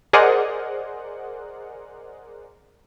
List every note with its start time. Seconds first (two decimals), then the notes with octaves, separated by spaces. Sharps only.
0.13 G#4 A#4 C5 D5 D#5 F#5